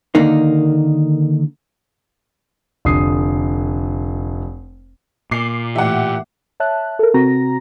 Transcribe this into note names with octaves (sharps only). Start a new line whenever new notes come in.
D3 D#3 A#3 D#4
F1 D3 D#6 C7
A#2 D6 C7
A2 E3 G4 E5 F#5
C#5 E5 A5 F#6
A4 A#4
C3 C4 F#4 A#5 A#6